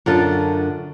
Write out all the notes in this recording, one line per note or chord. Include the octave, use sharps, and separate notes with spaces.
F#2 D3 F4 A4